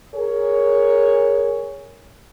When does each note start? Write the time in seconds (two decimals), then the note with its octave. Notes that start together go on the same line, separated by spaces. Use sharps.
0.15 G#4 A#4 C#5